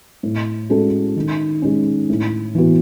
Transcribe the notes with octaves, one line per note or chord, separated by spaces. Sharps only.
A2
G#3 C#4 F#4 A4
D#3
G#3 C#4
A2
E3 B3 F#4